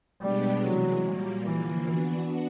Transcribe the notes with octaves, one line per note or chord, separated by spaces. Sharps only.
B2 G3 G#3 B3 D4 G4
C3 E3 F#3 G#3
A#2 G3 A#3
D3 E3 F3 A#3
E3 B3 D4 F#4